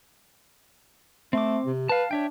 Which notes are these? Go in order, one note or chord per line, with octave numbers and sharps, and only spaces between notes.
A3 C4 D6
C3
B4 F5 A5
D4 C#5 E5 G5